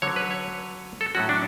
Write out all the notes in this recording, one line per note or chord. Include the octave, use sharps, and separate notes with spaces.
D3 F#3 C#4 C#5
B4
C#5
A4
A2 F#3 C#4 F#4
D4